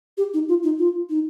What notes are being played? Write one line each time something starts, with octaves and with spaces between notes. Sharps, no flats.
G4
D#4
F4
D#4
F4
D#4